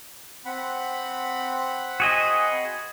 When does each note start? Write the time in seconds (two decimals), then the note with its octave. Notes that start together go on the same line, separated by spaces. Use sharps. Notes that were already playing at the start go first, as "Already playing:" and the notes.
0.46 C4 F#5 B5
2.00 F#4 G#4 D#5